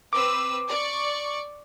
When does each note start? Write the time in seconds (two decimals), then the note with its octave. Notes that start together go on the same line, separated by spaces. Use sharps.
0.13 C4 B4 D6 E6
0.69 D5 C#6